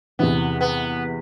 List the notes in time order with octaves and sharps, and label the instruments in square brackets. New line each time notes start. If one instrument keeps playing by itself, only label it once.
[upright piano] E2 C3 E3 [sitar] B3
[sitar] B3